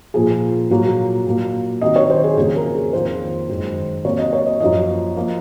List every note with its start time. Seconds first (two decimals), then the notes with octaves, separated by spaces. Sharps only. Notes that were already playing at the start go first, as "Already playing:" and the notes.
0.14 A#2 F3 A#3 G#4
0.70 A#2 F#3 A#3
1.26 A#2 F#3 A#3
1.81 C3 D#3 F#3 D#5
1.96 C#5
2.10 C5
2.24 G#4
2.37 F2 C#3 F#3 A#3 G#4
2.56 A#4
2.75 G#4
2.93 F2 D#3 A#3 C5
3.49 F#2 D#3 G#3
4.05 C3 F#3 A#3 C#5
4.18 D#5
4.33 C#5
4.46 D#5
4.60 F#2 F3 A#3 D#5
5.17 F3 A#3